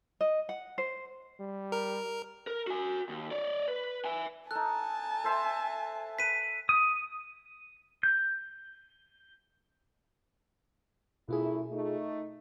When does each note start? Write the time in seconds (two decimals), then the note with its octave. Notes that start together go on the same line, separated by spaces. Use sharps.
0.21 D#5
0.49 F#5
0.78 C5
1.40 G3
1.72 A#4
2.47 A#4
2.67 F#4 G#5
3.09 D#2
3.31 C#5 D5
3.68 B4
4.05 E5 G#5
4.51 D#4 A4 G#5 A5 F#6
5.24 A4 C5 E5
6.19 B4 B6 D#7
6.69 D#6
8.03 G6
11.29 F#2 B2 A3 E4 F4 G#4
11.72 A3 D#4